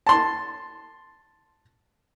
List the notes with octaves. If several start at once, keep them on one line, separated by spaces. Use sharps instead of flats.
A5 C6